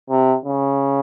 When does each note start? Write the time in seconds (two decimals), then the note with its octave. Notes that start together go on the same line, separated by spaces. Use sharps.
0.10 C3
0.45 C#3